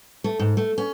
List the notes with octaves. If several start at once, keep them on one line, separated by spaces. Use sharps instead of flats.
A3
G#2
A3
C#4